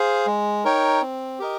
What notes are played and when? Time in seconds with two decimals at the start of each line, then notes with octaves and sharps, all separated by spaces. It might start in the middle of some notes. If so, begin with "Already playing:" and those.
Already playing: G#4 C5 F5
0.27 G#3
0.64 D#4 A#4 C#5 G5
1.02 C4
1.39 G4 A#4 D#5